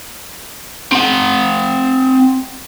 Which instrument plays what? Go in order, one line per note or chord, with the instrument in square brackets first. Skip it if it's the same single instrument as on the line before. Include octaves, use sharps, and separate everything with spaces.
[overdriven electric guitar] C4 F#5